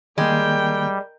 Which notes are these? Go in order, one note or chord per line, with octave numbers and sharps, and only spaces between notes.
D#3 G3 G#3 A#3 A#4 G5